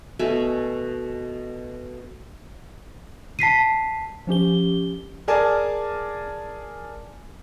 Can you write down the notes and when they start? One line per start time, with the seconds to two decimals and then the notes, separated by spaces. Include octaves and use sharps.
0.19 B2 A3 E5 G#5
3.39 A5 B6 C7 D#7
4.27 F3 C#4 G4 G7
5.28 G#4 A#4 D5 G#5 A5